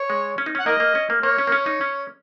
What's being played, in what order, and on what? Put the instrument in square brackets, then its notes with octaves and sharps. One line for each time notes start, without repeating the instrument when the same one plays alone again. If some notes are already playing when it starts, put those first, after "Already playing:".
Already playing: [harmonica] C#5
[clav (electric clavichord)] G#3
C#4
D#4
C#4
[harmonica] F#5
[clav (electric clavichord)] A#3 [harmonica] A#4 D#5
[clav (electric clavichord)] A#3
C#4
A#3
[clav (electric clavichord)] A#3 [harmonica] C#5
[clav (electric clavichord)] C#4
A#3
C#4
D#4
C#4